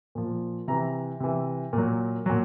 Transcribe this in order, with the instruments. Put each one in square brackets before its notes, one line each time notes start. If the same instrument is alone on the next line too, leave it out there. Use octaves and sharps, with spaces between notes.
[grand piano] A#2 F3
C3 E3 A#5
C3 E3
A#2 F#3
A#2 F#3